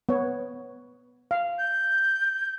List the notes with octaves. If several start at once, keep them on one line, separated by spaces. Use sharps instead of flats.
B3 C#5
F5
G6